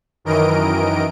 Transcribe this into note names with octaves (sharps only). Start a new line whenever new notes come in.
F#2 D#3 E3 A#4 D#5 D7